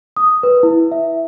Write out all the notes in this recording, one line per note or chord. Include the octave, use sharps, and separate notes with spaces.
D#6
B4
E4
E5